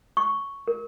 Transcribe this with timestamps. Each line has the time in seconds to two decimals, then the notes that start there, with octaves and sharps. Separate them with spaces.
0.17 C#6
0.68 A#4